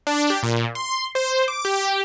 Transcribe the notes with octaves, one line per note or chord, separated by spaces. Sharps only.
D4
G4
A#2
C6
C5
D6
G4